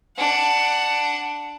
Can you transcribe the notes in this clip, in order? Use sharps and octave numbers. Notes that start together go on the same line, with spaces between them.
D4 F#5